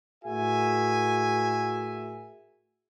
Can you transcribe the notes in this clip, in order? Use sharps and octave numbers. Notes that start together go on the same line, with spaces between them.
A2 F#4 G#4 A#4 E5 G#5